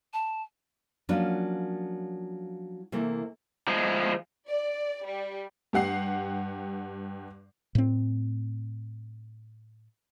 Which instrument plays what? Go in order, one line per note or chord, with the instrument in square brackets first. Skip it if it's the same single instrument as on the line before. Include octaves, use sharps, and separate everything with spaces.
[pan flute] A5
[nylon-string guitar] F3 F#3 A#3 C#4 D4 F4
C3 E3 A3 A#3
[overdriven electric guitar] F3 G#3
[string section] D5
G3
[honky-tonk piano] G2 G4 F#5 C7
[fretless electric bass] A2 C4